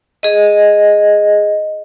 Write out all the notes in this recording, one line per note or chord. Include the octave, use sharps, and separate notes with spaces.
G#4 D#5